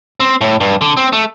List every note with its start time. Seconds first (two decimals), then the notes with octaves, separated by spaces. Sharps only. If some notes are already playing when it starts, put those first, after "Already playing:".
0.20 C4
0.41 A2
0.61 G2
0.81 D3
0.97 C4
1.13 A3